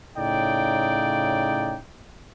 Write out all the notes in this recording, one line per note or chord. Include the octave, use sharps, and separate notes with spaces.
A2 C#3 D#4 D5 G5